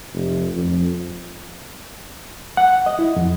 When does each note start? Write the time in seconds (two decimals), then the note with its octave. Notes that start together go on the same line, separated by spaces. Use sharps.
0.13 F1
0.54 F2
2.57 F#5
2.86 D#5
2.99 E4
3.16 F2